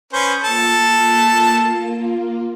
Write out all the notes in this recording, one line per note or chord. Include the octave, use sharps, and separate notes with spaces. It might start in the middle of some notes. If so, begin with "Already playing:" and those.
C#4 B4 C5 D#6
A#3 F4 A4 A5